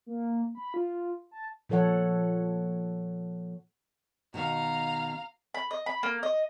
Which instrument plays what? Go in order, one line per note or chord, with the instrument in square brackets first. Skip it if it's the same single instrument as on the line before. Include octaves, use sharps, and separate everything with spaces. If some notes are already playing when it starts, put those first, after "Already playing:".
[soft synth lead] A#3
B5
F4
A5
[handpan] A#2 F3 A4 C#5 F#5
[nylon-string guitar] B2 D#3 [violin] F5 A#5
[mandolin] B5
D#5
B5
A#3
D#5